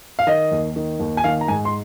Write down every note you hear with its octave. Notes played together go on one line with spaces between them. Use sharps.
F5
D#3 D#5
D#2
D#3
D#2
G#5
D#3 F5
A#5
G#2 G#5
C6